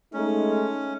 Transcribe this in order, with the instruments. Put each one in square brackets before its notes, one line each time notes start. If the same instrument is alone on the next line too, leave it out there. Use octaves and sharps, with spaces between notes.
[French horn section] G#3 A3 D#4 [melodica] C#4